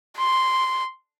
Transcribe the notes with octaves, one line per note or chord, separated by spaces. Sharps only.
C6